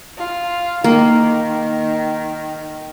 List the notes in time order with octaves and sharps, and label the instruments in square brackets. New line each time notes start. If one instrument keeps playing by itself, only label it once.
[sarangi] F4
[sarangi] D#3 [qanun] A#3